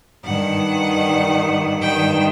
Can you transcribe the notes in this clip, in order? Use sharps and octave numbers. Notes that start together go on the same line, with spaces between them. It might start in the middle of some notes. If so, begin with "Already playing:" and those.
G2 D#3 F#5
G2 D#3 G5